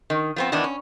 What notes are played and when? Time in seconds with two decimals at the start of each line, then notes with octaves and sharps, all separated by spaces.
0.10 D#3
0.36 F3 B3 C4
0.52 D#3 E3 B3 D4
0.64 C#4